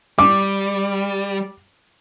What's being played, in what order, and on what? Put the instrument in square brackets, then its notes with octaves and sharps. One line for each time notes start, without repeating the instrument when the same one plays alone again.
[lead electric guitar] G3 [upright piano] D6